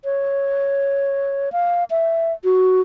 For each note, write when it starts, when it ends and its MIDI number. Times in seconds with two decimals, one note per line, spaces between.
0.04 1.52 73
1.52 1.84 77
1.90 2.33 76
2.44 2.81 66